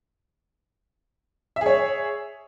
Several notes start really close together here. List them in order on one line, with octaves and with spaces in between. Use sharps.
E5 G#4 C#5